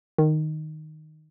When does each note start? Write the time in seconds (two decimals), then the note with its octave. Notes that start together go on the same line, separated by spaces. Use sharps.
0.18 D#3